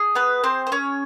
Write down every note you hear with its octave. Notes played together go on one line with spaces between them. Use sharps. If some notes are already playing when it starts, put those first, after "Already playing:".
Already playing: G#4
B3 B4
C4 C5
C5
C#4 C#5